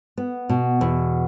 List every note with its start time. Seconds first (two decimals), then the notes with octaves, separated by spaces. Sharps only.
0.17 B3
0.49 B2
0.81 E2